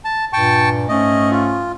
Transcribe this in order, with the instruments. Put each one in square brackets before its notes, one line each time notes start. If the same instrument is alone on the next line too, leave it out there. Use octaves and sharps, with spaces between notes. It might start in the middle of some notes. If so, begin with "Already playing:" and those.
[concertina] A5
[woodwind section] G2 A#2 [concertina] G5 A5 C#6
[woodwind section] G#2 A3 C#4 [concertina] D#5
[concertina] F4